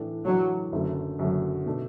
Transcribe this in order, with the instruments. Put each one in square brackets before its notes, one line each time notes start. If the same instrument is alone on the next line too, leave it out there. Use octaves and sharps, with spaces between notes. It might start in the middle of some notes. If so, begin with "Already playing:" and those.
Already playing: [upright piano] A2 E3 D4 A4
[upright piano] A2 E3 D4 A4 [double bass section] F#3
[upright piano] F#1 F#2 D3 F#3 A3
F#1 F#2 D3 F#3 A3
B2 A3 D4